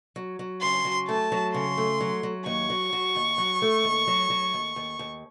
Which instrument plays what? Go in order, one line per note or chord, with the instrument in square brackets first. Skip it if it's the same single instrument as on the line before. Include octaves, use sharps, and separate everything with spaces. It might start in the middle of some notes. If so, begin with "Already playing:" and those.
[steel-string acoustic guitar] F#3
F#3
[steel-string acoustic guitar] C#3 [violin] C6
[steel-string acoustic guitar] F#3
[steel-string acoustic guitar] A3 [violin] A5
[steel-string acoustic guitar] F#3
[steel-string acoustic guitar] C#3 [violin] C6
[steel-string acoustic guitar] A3
F#3
F#3
[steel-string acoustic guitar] D#2 [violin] C#6
[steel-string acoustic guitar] F#3
F#3
D#2
F#3
A3
D#2
F#3
F#3
D#2
D#2
D#2